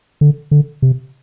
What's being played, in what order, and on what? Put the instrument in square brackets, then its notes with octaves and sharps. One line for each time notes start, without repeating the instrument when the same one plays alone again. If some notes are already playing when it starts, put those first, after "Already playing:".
[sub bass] D3
D3
C3